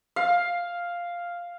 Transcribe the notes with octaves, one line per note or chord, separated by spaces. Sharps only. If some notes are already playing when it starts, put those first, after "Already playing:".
F5